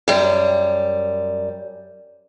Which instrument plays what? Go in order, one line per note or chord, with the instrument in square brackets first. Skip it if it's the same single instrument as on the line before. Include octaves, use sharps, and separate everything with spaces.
[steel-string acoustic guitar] F#2 G3